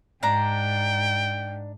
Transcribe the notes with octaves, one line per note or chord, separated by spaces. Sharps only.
G#2 D4 D5 G5 A#5